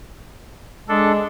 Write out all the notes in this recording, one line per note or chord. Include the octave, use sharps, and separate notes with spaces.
G#3 D4 A4